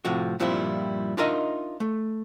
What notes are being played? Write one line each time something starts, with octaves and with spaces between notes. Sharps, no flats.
A2 C3 F3 F#4
G2 A#2 F3 G3 C4 E4
D4 D#4 F4 A#4 D#5 E5
A3